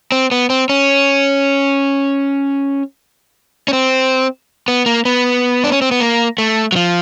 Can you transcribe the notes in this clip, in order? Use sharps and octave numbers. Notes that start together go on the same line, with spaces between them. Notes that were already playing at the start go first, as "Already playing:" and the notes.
C4
B3
C4
C#4
C#4
C4
B3
A#3
B3
D4
C#4
C4
B3
A#3
A3
F#3
F3